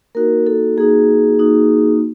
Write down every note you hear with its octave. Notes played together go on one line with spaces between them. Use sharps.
A#3 D#4 F#4 A#4
A4
A#3 D#4 F#4 G#4
A#3 D#4 F#4